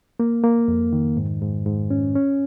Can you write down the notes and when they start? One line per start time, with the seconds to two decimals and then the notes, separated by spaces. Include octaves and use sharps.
0.20 A#3
0.44 A#3
0.68 F2
0.93 D#3
1.17 G#2
1.42 G#2
1.66 G#2
1.91 C#4
2.15 C#4